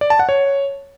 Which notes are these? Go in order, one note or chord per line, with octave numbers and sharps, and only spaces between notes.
D5
A5
F#5
C#5